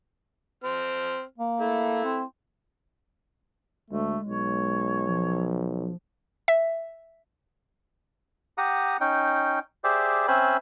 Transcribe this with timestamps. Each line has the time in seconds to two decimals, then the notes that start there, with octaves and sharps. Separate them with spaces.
0.64 C4 F6
1.38 A#3
1.60 A3 E4
2.04 C4
3.91 D2 G#3 A3
4.27 B1 C#5
5.08 F3
6.48 E5
8.58 G4 F#5 A#5 D#6
9.01 C#4 D#4 G5
9.84 G4 G#4 C5 D5 E5
10.28 C4 C#4 C5 E5 G#5 B5